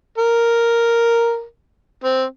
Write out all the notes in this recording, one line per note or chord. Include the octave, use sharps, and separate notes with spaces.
A#4
C4